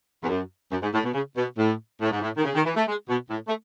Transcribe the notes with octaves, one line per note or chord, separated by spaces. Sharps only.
E2
F#2
F#2
G#2
A2
B2
C#3
B2
A2
A2
G#2
A2
D#3
C#3
D#3
E3
A3
G#3
B2
A2
A3